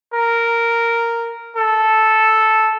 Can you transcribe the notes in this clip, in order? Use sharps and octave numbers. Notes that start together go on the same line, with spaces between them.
A#4
A4